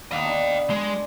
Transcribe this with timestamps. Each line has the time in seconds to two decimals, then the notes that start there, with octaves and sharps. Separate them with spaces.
0.11 B3 D#4 D#5 F5
0.24 D4
0.70 G#3 D5 C6